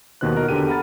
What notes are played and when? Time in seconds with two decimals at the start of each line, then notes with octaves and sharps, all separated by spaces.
0.21 D#2 B2 D#3 C5 F#6
0.35 F4 F#4 A#4 D#5
0.48 E2 D3 G4 G5 D#7
0.68 F#5 A#5 B5 F6 A6